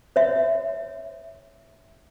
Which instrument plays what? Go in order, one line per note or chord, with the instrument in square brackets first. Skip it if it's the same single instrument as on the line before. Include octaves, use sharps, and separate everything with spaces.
[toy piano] C#5 E5